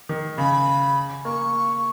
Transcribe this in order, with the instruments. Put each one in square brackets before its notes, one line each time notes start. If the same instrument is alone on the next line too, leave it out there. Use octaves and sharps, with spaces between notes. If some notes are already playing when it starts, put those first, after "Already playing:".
[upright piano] D#3
[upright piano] C#3 [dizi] B5
[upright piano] A#3 [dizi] C#6